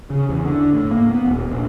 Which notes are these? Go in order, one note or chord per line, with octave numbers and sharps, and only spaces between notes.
C#3
E2
D3
A2
A#3
B3
D#1
A#1